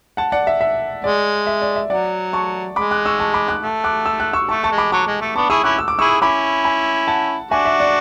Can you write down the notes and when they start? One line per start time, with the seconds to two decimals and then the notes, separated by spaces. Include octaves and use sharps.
0.17 F#5 A5
0.32 D5 F#5
0.47 E5
0.61 E5
1.04 G#3 D5
1.47 E5
1.62 D5
1.76 E5
1.90 F#3 D5 F#5
2.33 A5 C#6
2.76 G#3 B5 D6
2.91 D6 F#6
3.05 C#6 E6
3.19 A5 C#6
3.34 B5 D6
3.48 D6 F#6
3.63 A3
3.84 D6 F#6
4.06 E6
4.20 F#6
4.33 C#6 E6
4.49 A3 A5 C#6
4.64 A5 C#6
4.71 G#3
4.78 B5 D6
4.92 F#3 A5 C#6
5.07 G#3
5.21 A3
5.35 B3 D4 A5 C#6
5.50 E4 G#4 C#6 E6
5.64 C#4 E4 D6 F#6
5.79 E6
5.88 D6
5.99 E4 G#4 C#6 E6
6.21 C#4 E4 B5 D6
6.65 G#5 B5
7.08 F#5 A5
7.51 D4 F#4 E5 G#5
7.65 E5
7.80 D5 F#5